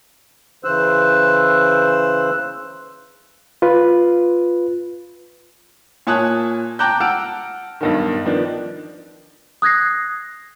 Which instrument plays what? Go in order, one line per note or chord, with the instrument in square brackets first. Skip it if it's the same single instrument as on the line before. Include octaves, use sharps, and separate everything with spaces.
[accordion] C#3 E3 C5 E6 F#6
[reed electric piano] F4 B4
[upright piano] A#2 C#5 G#5 A5 D#6 F#6
G5 A5 A#5 D6 F#6 G6
F#5 A5 E6 F6 D7
B1 G2 D#3
D#3 F3 B3 D4
[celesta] D#6 F#6 G#6 A#6 C7